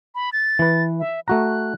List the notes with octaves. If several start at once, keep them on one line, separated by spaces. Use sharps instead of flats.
B5
A6
E3 B4
E5
A3 F#4 A#5 F#6